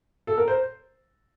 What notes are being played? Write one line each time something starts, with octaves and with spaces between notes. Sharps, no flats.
A4
A#4
C5